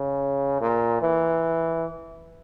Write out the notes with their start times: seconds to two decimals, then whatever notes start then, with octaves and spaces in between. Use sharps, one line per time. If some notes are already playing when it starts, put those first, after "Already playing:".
Already playing: C#3
0.61 A#2
1.02 E3